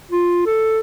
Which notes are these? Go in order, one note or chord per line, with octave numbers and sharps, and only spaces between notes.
F4
A4